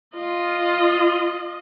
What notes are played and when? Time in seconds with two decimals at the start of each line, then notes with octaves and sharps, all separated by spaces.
0.15 F4 D#5